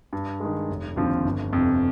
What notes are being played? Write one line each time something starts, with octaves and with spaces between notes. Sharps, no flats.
G2
D#3 G#3
F1
D#2 D3 F3 C4
G1
F2 C3